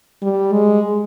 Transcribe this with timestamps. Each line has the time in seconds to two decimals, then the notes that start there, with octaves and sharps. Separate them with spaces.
0.22 G3
0.53 G#3